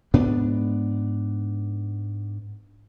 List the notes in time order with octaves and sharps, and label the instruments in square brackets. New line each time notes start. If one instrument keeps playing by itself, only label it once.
[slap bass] G#2 B3 D4